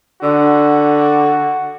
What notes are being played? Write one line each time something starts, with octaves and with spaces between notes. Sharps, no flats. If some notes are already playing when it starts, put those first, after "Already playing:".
D3 F#4